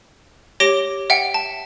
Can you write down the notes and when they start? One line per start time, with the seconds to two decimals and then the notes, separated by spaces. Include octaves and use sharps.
0.60 G4 C#5 D6 A#6 D7 G7
1.10 E5 F#5 G5
1.34 A5